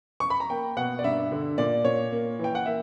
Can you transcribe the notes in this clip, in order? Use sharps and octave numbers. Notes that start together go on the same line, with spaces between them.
C#6
B5
A#5
A#3 G5
B2 F#5
D5
G2 E5
D3
A#2 D5
A#2 C#5
A#3
E3 G5
F#5
A#3 E5